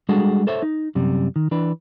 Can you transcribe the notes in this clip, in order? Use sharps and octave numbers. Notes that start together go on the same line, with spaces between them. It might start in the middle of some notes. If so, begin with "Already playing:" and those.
G3 G#3 D4 F#4 G#4 A4
A4 C5 C#5 E5
D#4
F#2 C3 G3
D#3
E3 D4 B4